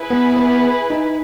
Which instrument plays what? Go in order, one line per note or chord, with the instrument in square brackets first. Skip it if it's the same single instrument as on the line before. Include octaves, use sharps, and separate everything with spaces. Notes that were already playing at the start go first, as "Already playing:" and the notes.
Already playing: [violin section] E4 G#4 B4
[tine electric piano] B3
B3
D#4